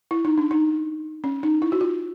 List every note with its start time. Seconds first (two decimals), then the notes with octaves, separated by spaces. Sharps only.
0.11 E4
0.25 D#4
0.38 D4
0.51 D#4
1.24 C#4
1.43 D#4
1.62 E4
1.72 F#4
1.81 F4